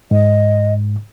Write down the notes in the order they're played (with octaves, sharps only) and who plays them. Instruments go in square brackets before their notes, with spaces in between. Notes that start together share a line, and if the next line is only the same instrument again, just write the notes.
[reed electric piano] G#2 [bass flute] D#5